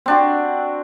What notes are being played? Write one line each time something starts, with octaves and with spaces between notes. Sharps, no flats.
C4 D4 F#4